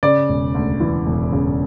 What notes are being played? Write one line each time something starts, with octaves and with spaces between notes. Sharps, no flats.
C#3 D5
E1
D2
E3
E1
C#3